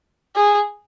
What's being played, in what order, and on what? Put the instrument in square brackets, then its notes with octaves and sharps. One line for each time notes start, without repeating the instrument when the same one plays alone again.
[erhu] G#4